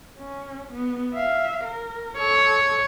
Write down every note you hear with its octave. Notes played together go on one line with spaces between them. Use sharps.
C#4
B3
E5 F5
A#4
A4 C#5